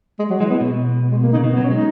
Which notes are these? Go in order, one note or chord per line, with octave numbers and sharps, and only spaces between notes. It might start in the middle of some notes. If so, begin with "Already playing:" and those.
G#3
F#3
E3 G#3
B3
B2
G#3
A#3
C#3 D#4
B2
B3
F#3
C#4
G#3 D#4